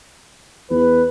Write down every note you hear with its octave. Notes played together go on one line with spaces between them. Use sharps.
E2 B4